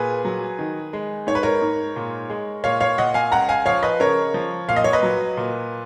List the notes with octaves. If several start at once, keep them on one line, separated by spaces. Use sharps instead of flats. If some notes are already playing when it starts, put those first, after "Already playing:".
Already playing: A#2 G#4 B4
F#3
D#3
G#3
G#2 C#5
B4
A#4 C#5
G#2
A#2
G#3
A#2 C#5 F5
C#5 F5
A#2 D#5 F#5
F5 G#5
C#2 F#5 A#5
F5 G#5
F3 C#5 F5
B4 D#5
C#3 A#4 C#5
F3
A#2 F5
D#5
C#5
B4 D#5
F#3
A#2